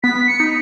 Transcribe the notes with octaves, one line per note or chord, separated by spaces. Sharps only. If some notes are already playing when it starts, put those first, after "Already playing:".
B3 B6
B3
C#7
D#4